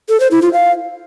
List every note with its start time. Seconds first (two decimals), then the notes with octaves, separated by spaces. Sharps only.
0.09 A4
0.20 C5
0.31 E4
0.42 F4
0.53 F5